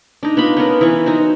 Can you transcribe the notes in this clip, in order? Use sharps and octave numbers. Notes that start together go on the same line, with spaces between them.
D4 D#4
B3 F4 B5
B3 C#4 A#4
E3 C#6
D#4 F#4 C5